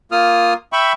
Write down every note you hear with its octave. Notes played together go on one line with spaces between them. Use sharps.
A#3 F4 D#6 F6
E5 G5 B5 C#6